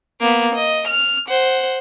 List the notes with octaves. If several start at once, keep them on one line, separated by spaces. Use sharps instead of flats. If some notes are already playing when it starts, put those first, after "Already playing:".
A#3 B3
D#5
F6
C5 F#5